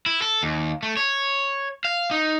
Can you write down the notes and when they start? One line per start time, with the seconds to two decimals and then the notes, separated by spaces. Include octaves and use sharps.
0.06 E4
0.22 A4
0.43 D#2
0.83 A3
0.97 C#5
1.85 F5
2.11 D#4